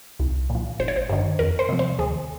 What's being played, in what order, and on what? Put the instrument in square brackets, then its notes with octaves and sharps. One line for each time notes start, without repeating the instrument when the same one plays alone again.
[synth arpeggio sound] C2
A#2
F3
G#1 C5
C#5
C5
G2 D#3
F2 A#4
C5
C3 F3
C5
D#2 G#4